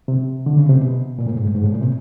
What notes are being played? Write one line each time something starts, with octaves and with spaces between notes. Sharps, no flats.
C3
D3
C#3
C3
B2
A#2
A2
G#2
G2
G#2
A2
A#2
C3